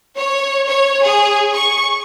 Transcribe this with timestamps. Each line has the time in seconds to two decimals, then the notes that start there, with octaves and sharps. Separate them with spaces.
0.17 C#5
0.68 C#5
1.03 G#4
1.54 C#6